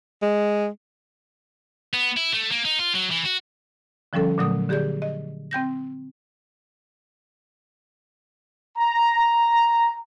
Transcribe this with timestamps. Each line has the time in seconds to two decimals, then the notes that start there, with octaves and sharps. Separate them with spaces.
0.22 G#3
1.94 B3
2.17 E4
2.33 A3
2.52 A#3
2.65 D#4
2.79 F4
2.95 F#3
3.11 E3
3.26 F#4
4.13 D3 F3 G3 C#4 A4
4.38 A#2 D3 F#3 A3 D#6
4.69 D3 G4 G#4 D5 G6
5.02 D#5
5.51 C4 G5 G6 A#6
8.77 A#5